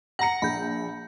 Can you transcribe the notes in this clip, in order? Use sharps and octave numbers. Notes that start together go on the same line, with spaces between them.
F#5 A#5 A#6 C#7
A#1 B5 G6